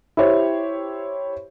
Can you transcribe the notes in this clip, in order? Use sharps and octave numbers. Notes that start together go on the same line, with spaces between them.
E4 G4 C5 C#5